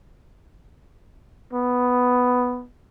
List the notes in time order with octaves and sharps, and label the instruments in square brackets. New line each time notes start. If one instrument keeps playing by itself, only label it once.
[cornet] B3